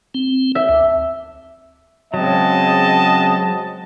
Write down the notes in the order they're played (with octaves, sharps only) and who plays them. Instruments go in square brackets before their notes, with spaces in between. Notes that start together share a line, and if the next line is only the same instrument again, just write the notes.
[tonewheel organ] C4
[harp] E5
[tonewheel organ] D2
[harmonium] C#3 G#3 C4 [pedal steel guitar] F#3 [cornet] D#5 [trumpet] A5